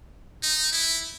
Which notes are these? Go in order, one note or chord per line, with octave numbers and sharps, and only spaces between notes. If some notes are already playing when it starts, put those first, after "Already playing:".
D#4
E4